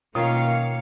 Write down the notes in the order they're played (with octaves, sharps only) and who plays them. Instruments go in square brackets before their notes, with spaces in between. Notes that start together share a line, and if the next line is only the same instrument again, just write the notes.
[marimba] B2 [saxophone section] D#3 C#4 F4 [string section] A#3 F5 C#7